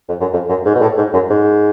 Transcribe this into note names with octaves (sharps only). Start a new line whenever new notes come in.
F2
F#2
F2
F#2
G#2
B2
A2
G#2
F#2
G#2